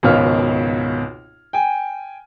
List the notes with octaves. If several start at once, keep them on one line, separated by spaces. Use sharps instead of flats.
G#1 C#2 B2 C#5 F5 F6
G5 G#5